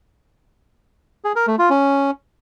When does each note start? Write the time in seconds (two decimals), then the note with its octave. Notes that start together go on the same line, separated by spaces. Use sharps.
1.24 G#4
1.36 A#4
1.47 A3
1.59 F4
1.70 C#4